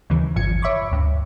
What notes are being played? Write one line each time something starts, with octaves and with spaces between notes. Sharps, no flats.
D#2 C#3 E3
G#1 G2 F3 G#6 C#7
C#5 E5 B5 C#6 D6
D2 G2